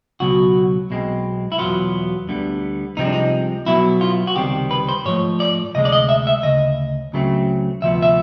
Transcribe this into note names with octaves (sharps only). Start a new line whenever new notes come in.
C#2 B2 F#3 F#4
B1 B2 G#3 C4
E4
E2 B2 F#3 B3 F4
D2 D3 G3 B3
C2 C3 F3 G#3 C4 D#4
D4
D#4
B2 F#3 B3 E4
F4
F#4
C#2 C3 D#3 G3 C4 G4
B4
C5
G#2 F3 A3 C#5
D5
D2 C3 G#3 D#5
D5
D#5
E5
E5
D2 C#3 D#5
C#2 C#3 F#3 A3 C4
D2 C3 F3 B3 E5
E5